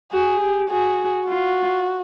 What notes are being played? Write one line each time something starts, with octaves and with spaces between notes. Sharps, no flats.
F#4 G#4
G4
F#4 G#4
F4 F#4